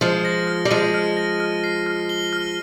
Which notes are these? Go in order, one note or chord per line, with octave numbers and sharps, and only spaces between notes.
F3 G#3 F6
A#6
F6
G3
F3 G#3 D#7
F6
A#6
F6
C7
F6
G7
F6